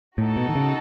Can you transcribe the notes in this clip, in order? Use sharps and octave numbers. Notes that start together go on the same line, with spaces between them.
A2 D#4 F#4 A4
B2
D#3
C#3